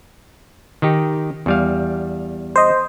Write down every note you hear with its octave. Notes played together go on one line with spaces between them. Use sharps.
D#3 D#4 G4
E2 G3 F5
C5 D#5